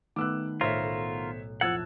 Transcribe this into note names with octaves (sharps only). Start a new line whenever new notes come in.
D#3 A3 B3 D6 E6 F#6
B1 A2 F4 A#4 C5 C#5 E5
F2 E4 F#5 E6 F#6 G#6 A6